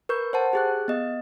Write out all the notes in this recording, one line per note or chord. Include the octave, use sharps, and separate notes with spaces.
A#4 B4 C#6 G6
C5 F#5 A5
G4 G#4 F#6
B3 D#5